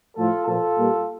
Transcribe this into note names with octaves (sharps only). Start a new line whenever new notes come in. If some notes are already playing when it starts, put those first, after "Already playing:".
A2 F3 A3 F4 A4
A#2 F3 A#3 F4 A4
A#2 G3 A#3